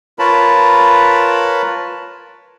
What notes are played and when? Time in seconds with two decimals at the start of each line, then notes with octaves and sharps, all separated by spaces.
0.19 F4 A#4 B4 C#5 A5 B5